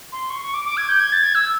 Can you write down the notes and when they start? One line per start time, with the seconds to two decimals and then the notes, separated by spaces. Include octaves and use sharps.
0.12 C6
0.30 C#6
0.42 C#6
0.54 D6
0.65 D6
0.77 G#6
0.89 G6
1.00 G#6
1.12 A6
1.23 G#6
1.35 E6